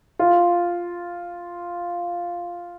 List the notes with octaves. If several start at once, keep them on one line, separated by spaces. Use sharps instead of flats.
F4